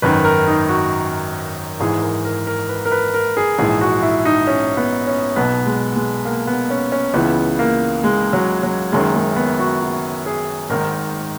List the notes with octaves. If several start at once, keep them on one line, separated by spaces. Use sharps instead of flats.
G#1 F#2 D#3 B4
A#4
D#4
F#4
G#1 G#2 E3 G#4
A#4
A#4
A#4
B4
A#4
B4
A#4
G#4
A#1 G#2 E3 G#4
F#4
E4
D#4
C#4
B3
C#4
B1 B2 B3
G#3
G#3
A#3
B3
C#4
C#4
C#2 C#3 E3 B3
A#3
G#3
F#3
F#3
F#1 F#2 D#3 G#3
G#3
B3
F#4
F#4
G#4
G#1 G#2 D#3 A#4